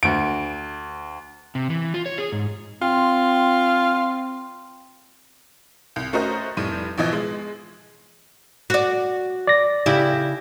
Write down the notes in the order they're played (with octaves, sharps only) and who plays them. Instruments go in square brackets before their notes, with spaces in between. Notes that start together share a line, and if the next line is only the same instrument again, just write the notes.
[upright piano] D2 D7
[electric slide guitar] C3
E3
F4
C#5
G#4
G#2
[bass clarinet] C4 [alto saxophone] F4
[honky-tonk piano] C2
A3 C#4 F#4 A#4 C5 D#5
F1 A2 G3 D#7
A1 B2 E3 F3 D#5 G#6
G#3
[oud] F#4 D5
[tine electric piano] D5 A#6
[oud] C#3 E4 G4